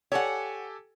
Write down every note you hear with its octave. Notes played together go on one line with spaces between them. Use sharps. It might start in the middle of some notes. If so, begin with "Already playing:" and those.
G4 A4 C#5 F#5 G#5